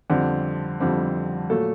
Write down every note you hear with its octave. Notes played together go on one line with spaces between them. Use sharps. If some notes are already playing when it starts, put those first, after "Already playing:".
F2 D3 G3 C4
F2 D3 G3 C4
A#2 F#3 A3 A4